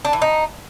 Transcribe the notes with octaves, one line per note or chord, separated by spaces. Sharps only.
D4
E3
D#4